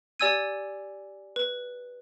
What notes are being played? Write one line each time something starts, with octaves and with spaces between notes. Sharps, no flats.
G4 D5 G#5 E6 G#6 D#7
B4